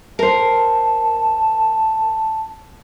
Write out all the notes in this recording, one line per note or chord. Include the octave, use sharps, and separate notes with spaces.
A#4 C5 A5